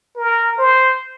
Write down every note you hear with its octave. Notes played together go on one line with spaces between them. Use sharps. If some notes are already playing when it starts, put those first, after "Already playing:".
A#4
C5